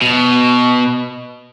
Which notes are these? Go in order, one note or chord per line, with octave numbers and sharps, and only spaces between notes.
B2